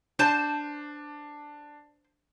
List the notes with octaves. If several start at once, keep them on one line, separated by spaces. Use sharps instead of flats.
D4 C5 A5